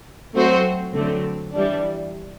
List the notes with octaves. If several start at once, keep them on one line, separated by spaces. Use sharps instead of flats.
F#3 A3 C4 F#4 C5
D3 F#3 A3 C4
E3 G3 D4